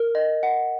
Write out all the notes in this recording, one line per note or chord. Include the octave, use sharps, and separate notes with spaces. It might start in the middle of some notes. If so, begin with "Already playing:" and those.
Already playing: A#4
D#5
F#5